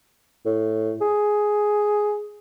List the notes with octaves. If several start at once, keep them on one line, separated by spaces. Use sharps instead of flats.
A2
G#4